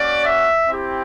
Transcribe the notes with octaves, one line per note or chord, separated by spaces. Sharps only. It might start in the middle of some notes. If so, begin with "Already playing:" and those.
Already playing: A#3 C#4 F#4 D5
E5
C4 E4 G4